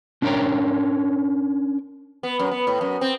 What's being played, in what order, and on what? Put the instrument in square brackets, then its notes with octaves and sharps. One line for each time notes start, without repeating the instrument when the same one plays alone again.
[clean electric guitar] C#4 D4 A#4 C#5 G5 A#5
[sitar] B3
F#2
B3
A2
F#2
C4